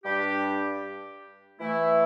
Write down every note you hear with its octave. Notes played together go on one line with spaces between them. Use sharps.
G2 G3 D4 G4
E3 A3 E4